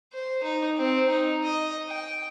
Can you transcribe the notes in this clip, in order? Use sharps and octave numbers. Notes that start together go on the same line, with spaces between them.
C5
D#4
C4
D#4
D#5
G5